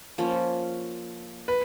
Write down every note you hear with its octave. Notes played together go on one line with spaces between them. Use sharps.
F3 A#3 C#4
B4